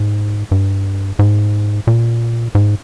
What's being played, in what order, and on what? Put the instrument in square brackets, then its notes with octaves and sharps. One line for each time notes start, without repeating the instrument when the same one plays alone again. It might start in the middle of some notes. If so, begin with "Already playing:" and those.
Already playing: [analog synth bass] G#2
G2
G#2
A#2
G#2